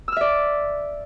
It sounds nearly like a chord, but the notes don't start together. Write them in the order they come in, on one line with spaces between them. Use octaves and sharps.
E6 F6 E5 D5